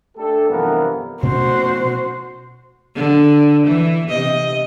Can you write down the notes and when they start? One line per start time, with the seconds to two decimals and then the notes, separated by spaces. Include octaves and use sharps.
0.17 A3 D4 G4 A4
0.50 G2 C3 E3 F3 B3 A#4
1.23 B2 A3 C#4 F#4 C5
2.96 D3
3.66 E3
4.09 C3 D#5